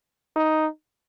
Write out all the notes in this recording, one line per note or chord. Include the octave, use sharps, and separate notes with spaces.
D#4